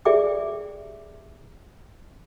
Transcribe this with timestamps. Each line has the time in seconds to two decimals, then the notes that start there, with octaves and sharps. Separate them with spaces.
0.05 G4 G#4 D5 E5 G5 D6